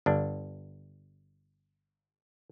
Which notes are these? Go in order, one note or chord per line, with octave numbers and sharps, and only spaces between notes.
G1 D4